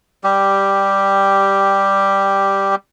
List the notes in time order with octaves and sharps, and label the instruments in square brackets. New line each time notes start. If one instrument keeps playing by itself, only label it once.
[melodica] G3 G4